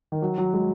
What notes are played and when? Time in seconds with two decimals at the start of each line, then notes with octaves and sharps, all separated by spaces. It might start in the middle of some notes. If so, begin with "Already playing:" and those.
0.12 D#3
0.22 F#3
0.38 F#3
0.53 G#3